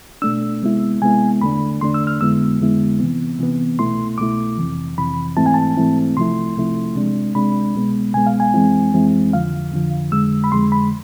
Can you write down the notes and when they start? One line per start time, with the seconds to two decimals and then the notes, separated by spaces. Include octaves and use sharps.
0.22 B2 A3 D4 E6
0.62 C3 G#3 B3 E4
1.01 C3 G#3 B3 E4 G#5
1.41 E2 D3 A3 D4 B5
1.81 E2 D3 A3 D4 C6
1.94 E6
2.07 F6
2.21 F2 D3 G#3 B3 E4 E6
2.60 F2 D3 G#3 B3 E4
3.00 C3 E3 B3
3.39 C3 E3 B3
3.79 C2 B2 A3 E4 C6
4.18 C2 B2 A3 E4 D6
4.58 F2 C3 E3
4.97 F2 C3 E3 B5
5.37 G#2 E3 A3 C4 E4 A5
5.46 G#5
5.54 A5
5.77 G#2 E3 A3 C4 E4
6.16 C2 C3 F3 A3 E4 C6
6.56 C2 C3 F3 A3 E4
6.96 C3 G#3 D4
7.35 C3 G#3 D4 B5
7.75 C2 B2 G#3 B3
8.14 C2 B2 G#3 B3 G#5
8.27 F5
8.40 G#5
8.54 F2 E3 G#3 C4 E4
8.93 F2 E3 G#3 C4 E4
9.32 F2 D3 F3 F5
9.72 F2 D3 F3
10.12 F2 D3 G#3 E6
10.44 B5
10.52 F2 D3 G#3 C6
10.72 B5